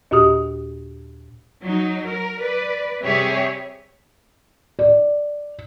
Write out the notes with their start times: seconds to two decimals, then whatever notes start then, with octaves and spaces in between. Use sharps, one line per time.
0.11 D#2 A#2 F#4 G4 D#6
1.63 F#3 D#4
2.07 A#4
2.41 B4 D5
3.02 C3 G3 G4 G#4 C#5 E5
4.79 D5